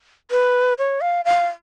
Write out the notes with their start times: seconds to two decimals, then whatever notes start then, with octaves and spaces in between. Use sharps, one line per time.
0.31 B4
0.79 C#5
1.01 F5
1.25 F5